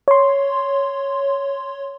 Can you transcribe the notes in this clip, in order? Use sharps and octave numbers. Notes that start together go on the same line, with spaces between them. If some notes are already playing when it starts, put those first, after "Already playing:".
C#5 C6